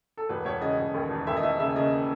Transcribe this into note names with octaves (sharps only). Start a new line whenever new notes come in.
A4
E1 B4
E1 C#5
C#3 D#5
E1
D#2
E1
D#2 E5
D#5
E1 E5
C#3 E5
C#3 D#5